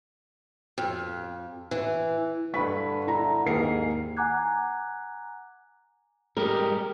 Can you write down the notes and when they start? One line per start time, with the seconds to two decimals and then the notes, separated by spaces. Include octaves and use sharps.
0.78 F2
1.71 E3
2.54 G2 D3 B4 B5 C#6 B6
3.07 E4 A#5
3.46 D#2 G#2 A#3 G#4 A#4 C7
4.17 F#5 G#5 A#5 D6 F#6 G#6
6.37 G3 G#3 G4 A#4